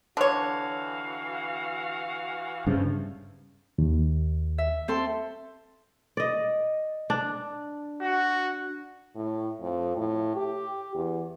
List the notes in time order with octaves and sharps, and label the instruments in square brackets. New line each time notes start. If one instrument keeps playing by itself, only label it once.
[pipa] D3 C#5 [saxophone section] E3 F#4 F5
[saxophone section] E2 F3 A3 [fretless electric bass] G2 C#3
[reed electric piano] D#2
[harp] E5
C4 A4 C6
[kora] D5 D#5
D4
[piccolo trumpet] F#4
[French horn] A2
F2
A2
G4
E2